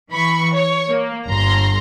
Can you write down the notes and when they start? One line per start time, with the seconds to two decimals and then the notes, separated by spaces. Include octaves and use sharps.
0.11 E3 B5 C#6
0.54 C#5
0.89 A#3
1.28 G1 A#5 C6